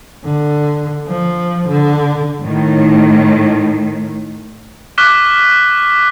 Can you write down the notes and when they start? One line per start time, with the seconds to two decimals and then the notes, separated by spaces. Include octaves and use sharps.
0.24 D3
1.07 F3
1.68 D3
2.43 A2 D#3
4.98 C#6 D6 F6 F#6 B6 G7